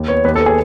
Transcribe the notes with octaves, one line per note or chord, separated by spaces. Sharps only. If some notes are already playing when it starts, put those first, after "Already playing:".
Already playing: D#2
B3 C#5
D#2 B4
A4
B3
G#4